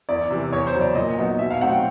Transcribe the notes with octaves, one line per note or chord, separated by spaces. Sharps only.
E2 D5
C3 E3
E2 C#5
C5
C#3 F#3
D5
A#2 D#5
F#3 B3 D#4
B2 E5
F5
F#3 A3 C4 D#4 F#5
G5